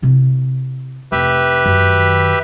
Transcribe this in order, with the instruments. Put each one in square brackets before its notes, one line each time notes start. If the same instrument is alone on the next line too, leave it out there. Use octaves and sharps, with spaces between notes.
[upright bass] C3 E4
[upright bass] F1 [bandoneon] G4 B4 E5
[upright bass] F#2 D#3